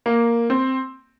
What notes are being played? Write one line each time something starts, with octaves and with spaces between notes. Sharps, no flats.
A#3
C4